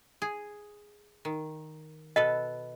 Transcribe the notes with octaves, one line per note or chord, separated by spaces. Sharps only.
G#4
D#3
B2 A4 B4 D#5